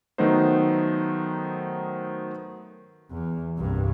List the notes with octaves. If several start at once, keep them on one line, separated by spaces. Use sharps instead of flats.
D#3 F#3 A3 B3 D#4 C5
E2
C2 G2